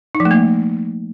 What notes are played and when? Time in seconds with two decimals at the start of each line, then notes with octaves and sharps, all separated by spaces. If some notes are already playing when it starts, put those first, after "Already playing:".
0.15 D#4
0.20 F3
0.25 A3
0.31 A#3